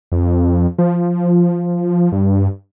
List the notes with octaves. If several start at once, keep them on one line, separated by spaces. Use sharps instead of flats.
F2
F3
G2